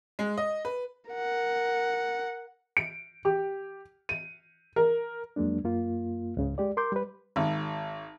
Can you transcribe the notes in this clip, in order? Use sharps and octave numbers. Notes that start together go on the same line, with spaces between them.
G#3
D#5
B4
A#4 F#5
D7
G4
D#7
A#4
F2 F#3 G#3 A#3 D4
F#2 A#3 F4
C#2 G#2 C#3
G#3 G4 D5
A#4 C6 D6 G6
G3 B4
G#1